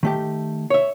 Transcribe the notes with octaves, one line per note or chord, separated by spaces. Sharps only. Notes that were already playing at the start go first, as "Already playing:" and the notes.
D#3 A3 G4
C#5 E5